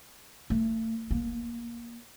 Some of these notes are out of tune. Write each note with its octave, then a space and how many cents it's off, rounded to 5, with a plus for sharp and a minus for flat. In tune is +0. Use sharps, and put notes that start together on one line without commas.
A3 +35
A#3 +15